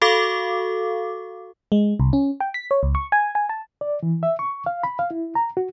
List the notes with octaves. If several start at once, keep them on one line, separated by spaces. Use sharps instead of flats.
F#4 A4 F5 C#6 D6
G#3
C2
C#4
G5
B6
C#5
C#2
C#6
G#5
G#5
A5
D5
E3
E5
C#6
F5
B5
F5
E4
A#5
F#4